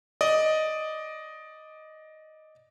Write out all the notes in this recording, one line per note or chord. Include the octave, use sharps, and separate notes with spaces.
D5 D#5 D#6